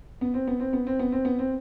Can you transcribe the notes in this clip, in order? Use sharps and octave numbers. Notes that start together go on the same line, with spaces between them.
B3
C4
B3
C4
B3
C4
B3
C4
B3
C4